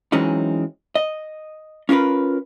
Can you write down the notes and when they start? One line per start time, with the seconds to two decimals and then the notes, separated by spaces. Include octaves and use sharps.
0.12 E3 F#3 G#3 C4 C#4 D#4
0.95 D#5
1.89 C#4 F4 G#4 A#4 B4